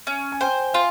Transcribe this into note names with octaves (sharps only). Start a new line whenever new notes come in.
C#4
G#5
C5 G5
F4 F5